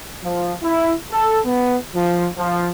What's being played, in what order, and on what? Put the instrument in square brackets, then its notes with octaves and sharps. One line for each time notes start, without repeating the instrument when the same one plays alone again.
[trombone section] F3
E4
A4
B3
F3
F3